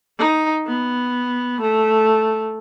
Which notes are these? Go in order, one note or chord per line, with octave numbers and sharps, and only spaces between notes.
D#4
B3
A3